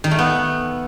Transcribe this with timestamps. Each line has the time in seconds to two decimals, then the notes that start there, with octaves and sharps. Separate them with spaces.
0.04 D#3
0.11 A3
0.19 B3